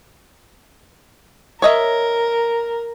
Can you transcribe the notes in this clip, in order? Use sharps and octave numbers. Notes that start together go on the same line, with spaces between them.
A#4 C#5 D#5 E5